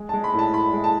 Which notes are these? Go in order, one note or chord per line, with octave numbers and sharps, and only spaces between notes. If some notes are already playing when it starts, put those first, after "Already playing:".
Already playing: G#3
A5
G#3
B5
A2
A5
A2 B5
G#3
A5